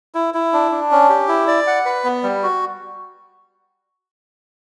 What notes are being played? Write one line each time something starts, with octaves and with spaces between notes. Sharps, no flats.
E4
E4
D4
D4
C#4
G4
E4
D5
F#5
B4
B3
G3
F#4